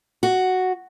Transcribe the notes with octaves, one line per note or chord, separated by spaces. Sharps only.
F#4